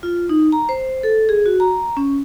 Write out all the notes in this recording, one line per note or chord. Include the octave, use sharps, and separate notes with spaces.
F4
D#4
A#5
C5
A4
G#4
F#4
A#5
C#4